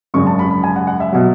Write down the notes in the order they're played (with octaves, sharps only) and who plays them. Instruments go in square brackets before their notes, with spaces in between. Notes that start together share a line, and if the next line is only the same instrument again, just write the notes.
[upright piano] G#1 F#2 C#3 G#3 C#6
A5
B5
B5
G#5
F#5
F#5
E5
B2 F#3